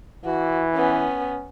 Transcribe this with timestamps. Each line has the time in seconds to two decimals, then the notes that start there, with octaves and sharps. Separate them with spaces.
0.25 E3 F#4
0.75 B3 C#4